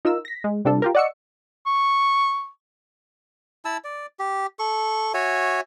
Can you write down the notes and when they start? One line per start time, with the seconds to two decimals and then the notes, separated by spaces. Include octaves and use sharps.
0.05 D#4 F4 A#4 E6
0.25 A#6 B6
0.44 G#3
0.65 C3 G3 D4 F4 A4
0.82 F4 G4 A#4
0.95 D5 D#5 F#5 C#6 E6 C#7
1.66 C#6
3.65 E4 A5 E6
3.84 D5
4.19 G4
4.59 A4 C#6
5.14 F#4 C#5 E5 G#5